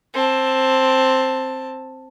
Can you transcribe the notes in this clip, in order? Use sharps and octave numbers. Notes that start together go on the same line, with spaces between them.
C4 A5